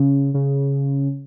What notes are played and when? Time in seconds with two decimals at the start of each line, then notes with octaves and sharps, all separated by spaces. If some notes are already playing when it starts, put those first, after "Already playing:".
Already playing: C#3
0.34 C#3